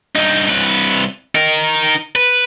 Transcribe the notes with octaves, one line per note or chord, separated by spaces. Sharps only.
G2 D#4
C2 B4
D#4 A#4
B4